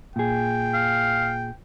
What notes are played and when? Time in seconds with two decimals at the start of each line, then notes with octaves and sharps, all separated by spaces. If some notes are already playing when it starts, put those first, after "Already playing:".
0.16 A#2 G#4 G5
0.74 F5